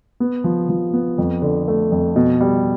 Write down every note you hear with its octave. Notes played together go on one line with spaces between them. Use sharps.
B3
F3
F3
B3
F2
D3
A3
F2
B2
G3